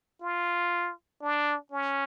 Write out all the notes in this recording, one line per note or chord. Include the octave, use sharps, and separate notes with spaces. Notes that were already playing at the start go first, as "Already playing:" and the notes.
F4
D4
C#4